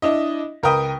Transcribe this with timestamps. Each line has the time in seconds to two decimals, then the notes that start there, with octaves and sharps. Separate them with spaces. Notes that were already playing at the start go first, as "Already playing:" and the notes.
0.02 D4 E4 D#5
0.63 C#2 A#4 B4 G5 D#6